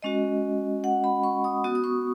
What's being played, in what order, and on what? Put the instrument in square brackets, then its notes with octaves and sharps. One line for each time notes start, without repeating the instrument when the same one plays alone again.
[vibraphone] G#3 C#4 F#4 D#5
F#5
B5
C#6
D#6
B3 F#4 D#6
D#6
C#6